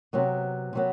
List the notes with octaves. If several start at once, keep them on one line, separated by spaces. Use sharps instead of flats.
C3 F#3 B3
C3 F#3 B3